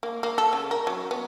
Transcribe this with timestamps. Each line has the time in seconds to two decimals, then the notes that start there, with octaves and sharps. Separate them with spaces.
0.03 A#3
0.23 A#3
0.38 A4
0.53 C#3
0.71 A#4
0.87 F#3
1.11 B3